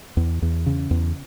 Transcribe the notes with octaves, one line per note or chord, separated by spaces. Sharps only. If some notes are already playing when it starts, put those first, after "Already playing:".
E2
E2
C#3
E2